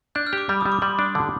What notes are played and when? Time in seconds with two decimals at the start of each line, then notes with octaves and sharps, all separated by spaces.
0.15 D4 G6
0.27 F6
0.33 G4 D6
0.49 G3 B5
0.61 G3 D#6
0.72 D6
0.82 G3 C6
0.99 D4
1.15 D3